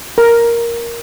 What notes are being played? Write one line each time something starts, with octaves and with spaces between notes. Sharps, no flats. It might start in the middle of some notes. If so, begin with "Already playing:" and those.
A#4